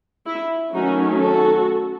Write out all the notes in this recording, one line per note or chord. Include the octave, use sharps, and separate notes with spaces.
E4
D#3 F#3 A3 C#4 D#4 F#4
F#4 A4